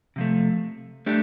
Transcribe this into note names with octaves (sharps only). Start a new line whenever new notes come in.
C3 F3 A3
A3 D4 G4